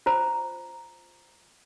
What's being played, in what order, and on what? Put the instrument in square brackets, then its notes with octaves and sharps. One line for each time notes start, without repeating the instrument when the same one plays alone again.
[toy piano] F4 C5 A#5